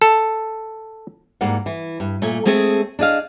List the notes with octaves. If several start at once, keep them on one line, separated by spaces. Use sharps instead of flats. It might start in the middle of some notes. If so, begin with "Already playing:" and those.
A4
G#2 G3 A#3 F#5
E3
G2
A#2 A3 G#5
G#3 A3 C4 G#4 A4
D4 G#4 D#5 F5